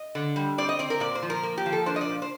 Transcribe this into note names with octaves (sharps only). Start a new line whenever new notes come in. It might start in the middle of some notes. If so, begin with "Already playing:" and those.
Already playing: D#5
D3
G3
C4 D5
D#5
C4 D5
A#4
A#2 D5
C5
F3
A#4
A#3
G4
F3
A4
D4 C5
D#5
D5
A#2
C5